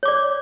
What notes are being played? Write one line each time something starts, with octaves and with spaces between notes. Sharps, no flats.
C#5 D5 D6